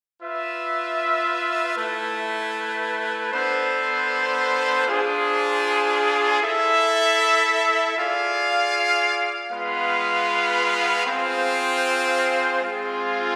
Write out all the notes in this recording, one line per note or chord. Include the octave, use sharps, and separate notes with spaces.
F4 B4 E5
A3 E4 B4
B3 D4 A4 C5
D4 F4 G#4 C5
E4 A4 E5
F4 G#4 D5 F5
G#3 B3 F4 B4 F5
C4 F4 G#4 C5 F5
G#3 C4 F4 G#4